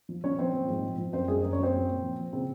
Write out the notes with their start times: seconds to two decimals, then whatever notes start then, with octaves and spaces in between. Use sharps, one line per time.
0.09 F3
0.24 F3 C#4 C#5
0.39 A#2 C4 C5
0.54 F3
0.68 G#2
0.83 F3
0.98 F3
1.13 F#2 C4 C5
1.28 F#2 G#3 G#4
1.43 F#2 A#3 A#4
1.53 C#4 C#5
1.59 F#2 C4 C5
1.74 A#2
1.89 A#2
2.03 F3
2.18 A#2
2.33 C#3 C4 C5